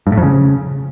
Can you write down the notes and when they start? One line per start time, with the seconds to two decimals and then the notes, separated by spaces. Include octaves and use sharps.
0.07 G2
0.12 A2
0.17 F2
0.23 C#3